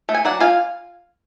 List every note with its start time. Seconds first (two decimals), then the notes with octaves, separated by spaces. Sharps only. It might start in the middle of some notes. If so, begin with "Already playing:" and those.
0.09 A3
0.14 G#5
0.25 F#3 D5 F#5
0.40 F4 F5 G#5